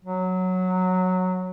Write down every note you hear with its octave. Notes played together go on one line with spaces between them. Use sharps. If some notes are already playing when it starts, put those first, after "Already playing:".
F#3